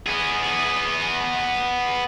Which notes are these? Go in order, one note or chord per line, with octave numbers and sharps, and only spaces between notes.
B3 G#4